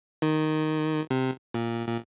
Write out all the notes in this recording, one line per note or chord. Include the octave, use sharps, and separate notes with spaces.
D#3
C3
A#2
A#2